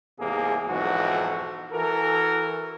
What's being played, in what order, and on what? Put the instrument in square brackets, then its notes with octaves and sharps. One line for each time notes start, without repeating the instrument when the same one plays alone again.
[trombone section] E2 G#2 C3 A#3 G#4
B1 F2 G#2 E3 F#4
E3 F#4 A4 A#4